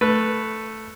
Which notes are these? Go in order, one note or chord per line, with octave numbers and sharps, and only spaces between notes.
A3 B4